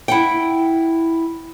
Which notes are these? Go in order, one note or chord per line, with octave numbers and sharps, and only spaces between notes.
E4 F#5 G5